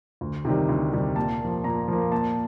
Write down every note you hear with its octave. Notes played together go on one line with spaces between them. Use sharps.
D2
C3 D#3 G3
D2
C3 D#3 G3
A#2 A5
F3 A#3
A#2 A#5
F3 A#3
A#2 A5